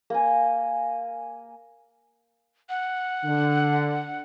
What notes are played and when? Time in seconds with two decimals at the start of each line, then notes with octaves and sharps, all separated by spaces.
0.10 A#3 G#5
2.69 F#5
3.25 D3